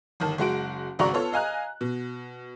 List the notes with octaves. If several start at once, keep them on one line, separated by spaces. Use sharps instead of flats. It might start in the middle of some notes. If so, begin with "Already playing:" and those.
G1 D#3 A5
F#1 G#3 F#4 D7
G#1 C#2 F#4 D5 A#5 C#6
B3 F4 A4 C#5
D#5 F5 G#5 A#5 F#6
B2